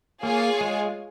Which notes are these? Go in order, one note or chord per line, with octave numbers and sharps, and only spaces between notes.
A#3 F4 G#4 C#5 F5 G#5
G#3